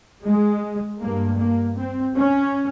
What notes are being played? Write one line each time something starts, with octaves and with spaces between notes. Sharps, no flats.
G#3
G2 A#3
A#3
C4
C#4